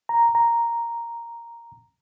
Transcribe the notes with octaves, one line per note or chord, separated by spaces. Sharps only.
A#5
A#5